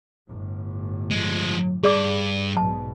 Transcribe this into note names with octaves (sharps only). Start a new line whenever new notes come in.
G1 A2
F3 G#3
G2 G#4 D5 D6
B1 G#2 B2 A5